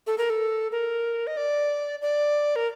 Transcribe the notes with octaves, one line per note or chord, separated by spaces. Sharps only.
A4
A#4
A4
A#4
D#5
D5
D5
A#4